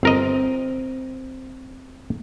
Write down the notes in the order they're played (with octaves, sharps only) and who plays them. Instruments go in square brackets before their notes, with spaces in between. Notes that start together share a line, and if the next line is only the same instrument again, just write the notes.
[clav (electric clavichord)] G1 A#4 D#5 [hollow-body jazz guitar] C4